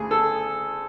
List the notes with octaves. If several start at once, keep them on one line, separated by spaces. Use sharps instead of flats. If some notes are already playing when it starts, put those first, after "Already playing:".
Already playing: D2 C#3 G#4
A4